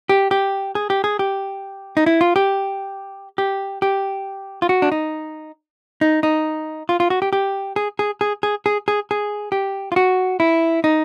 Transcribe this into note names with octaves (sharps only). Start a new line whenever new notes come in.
G4
G4
G#4
G4
G#4
G4
D#4
E4
F4
G4
G4
G4
F4
F#4
D4
D#4
D#4
D#4
F4
F4
F#4
G4
G4
G#4
G#4
G#4
G#4
G#4
G#4
G#4
G4
F4
F#4
E4
D#4